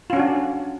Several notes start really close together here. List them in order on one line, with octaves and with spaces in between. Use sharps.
F4 C#4 F#4 D4